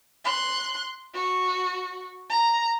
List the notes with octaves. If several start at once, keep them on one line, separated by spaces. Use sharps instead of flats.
C6 F#6
F#4
A#5